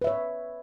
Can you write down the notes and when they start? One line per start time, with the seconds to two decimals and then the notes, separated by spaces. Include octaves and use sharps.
0.02 B4
0.04 E5
0.07 C#5